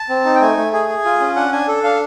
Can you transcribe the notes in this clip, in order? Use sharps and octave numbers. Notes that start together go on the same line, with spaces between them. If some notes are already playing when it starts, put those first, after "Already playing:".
Already playing: A5
C4
D#4
G5
A3 G#5
A3
G#4 G#5
G#4
F4
C#4
D4 F#5
D4 G#5
A4
D4 F5